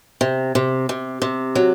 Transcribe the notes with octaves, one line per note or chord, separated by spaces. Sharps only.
C3
C3
C3
C3
F#3